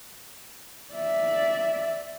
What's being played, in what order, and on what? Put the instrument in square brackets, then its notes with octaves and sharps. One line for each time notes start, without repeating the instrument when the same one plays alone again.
[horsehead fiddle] D5 E5